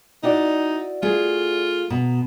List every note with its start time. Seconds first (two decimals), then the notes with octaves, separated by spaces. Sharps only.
0.23 D#4 E4 F#4 D5
1.03 A3 F4 G#4
1.90 B2 A#5